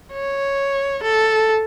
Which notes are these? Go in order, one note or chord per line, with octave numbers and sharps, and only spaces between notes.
C#5
A4